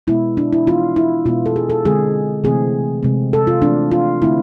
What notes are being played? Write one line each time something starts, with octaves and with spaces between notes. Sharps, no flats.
B2 G#3 B3 E4
D4
E4
E3 B3 F4
E4
B2 G#3 B3 F4
A4
G#4
A4
D3 G#3 C4 G#4
C3 E3 A3 C4 G#4
C3 G#3 C4
A4
F4
E3 A3 C4 D4
F4
D3 A3 C4 E4